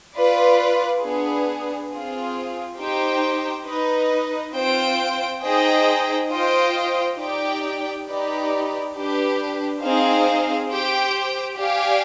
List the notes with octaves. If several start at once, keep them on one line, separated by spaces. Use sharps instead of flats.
F4 B4 D5
B3 D4 G#4
C4 F4 G#4
D#4 G4 C5 G5
D#4 B4 D#5
C4 F4 C5 G5
D#4 G#4 C5 D#5 G5
F4 C5 D#5 G5
D#4 G4 D5 G5
D#4 G4 B4 D5
D4 G4 B4
C4 D#4 G#4 C5 F5
G4 C5 G5
G4 D5 F5 G#5